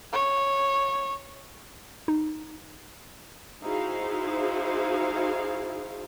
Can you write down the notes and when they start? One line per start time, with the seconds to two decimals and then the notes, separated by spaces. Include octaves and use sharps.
0.13 C#5
2.08 D#4
3.63 D#4 E4 F#4 G#4 C5 F5